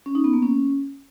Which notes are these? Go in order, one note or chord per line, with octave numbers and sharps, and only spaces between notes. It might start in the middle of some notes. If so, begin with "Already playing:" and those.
C#4
D#4
B3
A#3
C#4